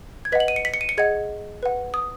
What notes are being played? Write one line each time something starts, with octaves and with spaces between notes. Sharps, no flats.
G#6
B4 D#5 F#5 B6
F#7
D#7
C#7
B6
C#7
D#7
C#7
G#4 D#5 F#5 G#6
B4 F#5
D#6